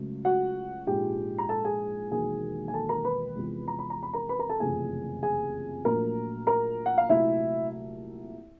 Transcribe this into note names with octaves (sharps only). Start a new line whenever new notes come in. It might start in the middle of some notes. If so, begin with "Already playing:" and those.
Already playing: C#2 C#3 F#3 A3
F#4 F#5
A#1 G#2 F3 G#3 G4 G5
A#5
A4 A5
G#4 G#5
E1 D#2 D#3 F#3 G#4 G#5
G#5
A4 A5
A#4 A#5
B4 B5
E2 C3 F3 G#3
A#5
B5
A#5
B5
A#4 A#5
B4 B5
A#4 A#5
A4 A5
F#1 F2 C3 E3 A3 G#4 G#5
G#4 G#5
A#1 A#2 F#3 A3 A#4 A#5
A#4 A#5
F#5
F5
C2 A#2 F#3 A3 E4 E5